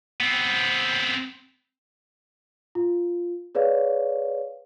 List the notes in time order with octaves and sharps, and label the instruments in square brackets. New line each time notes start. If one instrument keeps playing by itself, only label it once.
[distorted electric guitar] B3 C4
[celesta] F4
G#4 B4 C#5 D5 F5